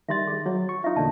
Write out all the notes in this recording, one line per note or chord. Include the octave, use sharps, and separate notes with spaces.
D#3 G3 E5 C6 A6
G#4
F#3 G#4 C#5
C#6
D#4 F4 E5
E2 A#2 D3 D5 A5